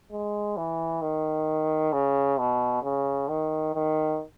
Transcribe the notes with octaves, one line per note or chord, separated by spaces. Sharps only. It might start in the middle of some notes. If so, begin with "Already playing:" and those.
G#3
E3
D#3
C#3
B2
C#3
D#3
D#3